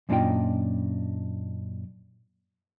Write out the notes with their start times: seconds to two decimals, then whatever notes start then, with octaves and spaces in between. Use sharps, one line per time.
0.09 F#2 A#2 D4 D#4 F4 G5